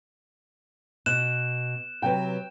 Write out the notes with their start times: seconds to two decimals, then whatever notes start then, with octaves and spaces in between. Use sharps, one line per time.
1.06 B2 F#6 E7
2.02 C3 F#3 B4 G5